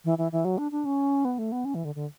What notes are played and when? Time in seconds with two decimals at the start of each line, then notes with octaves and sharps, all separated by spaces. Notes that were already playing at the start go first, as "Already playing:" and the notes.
0.05 E3
0.18 E3
0.32 E3
0.45 F#3
0.58 D4
0.72 D4
0.85 C#4
1.25 B3
1.39 A3
1.52 B3
1.65 C#4
1.75 E3
1.85 D3
1.95 D3